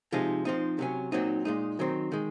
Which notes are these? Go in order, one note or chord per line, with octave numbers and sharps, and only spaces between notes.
C3 F3 G#3 D#4
F3 C4 D#4
C3 F#3 C#4
A#2 F#3 C4 D#4
A#2 G#3 D#4
D#3 F#3 C4
D#3 G#3